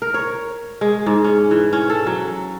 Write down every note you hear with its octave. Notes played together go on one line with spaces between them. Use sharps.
A#4
C#5
G#3
G#2
C#4
E3
C#4
A4
F#3